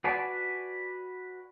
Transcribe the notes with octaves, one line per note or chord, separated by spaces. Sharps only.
F#4 B4 D5 G#5 A5